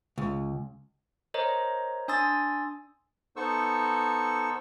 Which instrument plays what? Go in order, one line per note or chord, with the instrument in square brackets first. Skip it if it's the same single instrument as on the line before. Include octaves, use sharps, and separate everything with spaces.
[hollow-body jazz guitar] C#2
[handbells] A#4 C5 C#5 D#5 A#5
D4 G#5 C6 D#6 E6 A6
[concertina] B3 D#4 A4 C5 C#6 E6